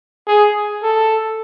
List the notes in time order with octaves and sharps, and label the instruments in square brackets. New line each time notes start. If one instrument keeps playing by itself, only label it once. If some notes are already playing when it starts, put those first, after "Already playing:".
[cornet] G#4
A4